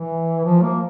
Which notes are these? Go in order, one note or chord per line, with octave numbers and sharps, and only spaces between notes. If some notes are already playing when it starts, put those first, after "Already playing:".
Already playing: E3
F3
A#3